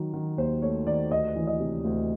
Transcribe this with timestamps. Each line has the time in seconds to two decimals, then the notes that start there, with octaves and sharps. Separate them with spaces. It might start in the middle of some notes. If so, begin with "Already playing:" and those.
Already playing: D#3 F#3
0.14 D#3
0.38 D#2 C5
0.62 A3 C#5
0.87 D#3 D5
1.11 D2 D#5
1.35 E3
1.47 D#5
1.60 C3
1.84 D2